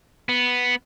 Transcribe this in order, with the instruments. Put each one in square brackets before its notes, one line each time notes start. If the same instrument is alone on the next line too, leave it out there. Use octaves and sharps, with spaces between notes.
[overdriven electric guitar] B3